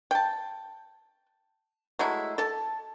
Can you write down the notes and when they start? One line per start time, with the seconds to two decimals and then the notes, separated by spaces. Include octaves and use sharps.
0.11 G5 A5
1.99 F#3 G#3 A3 E4
2.38 A4 A5